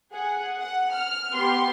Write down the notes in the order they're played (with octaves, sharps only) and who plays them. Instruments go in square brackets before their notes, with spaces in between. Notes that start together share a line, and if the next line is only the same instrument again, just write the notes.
[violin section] G#4 F#5
F#5
F6
B3 G4 C6